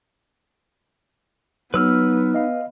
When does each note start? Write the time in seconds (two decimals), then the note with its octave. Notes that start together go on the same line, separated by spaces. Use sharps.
1.74 F#3 B3 D#4 B4 E6 F6
2.34 D#5 F5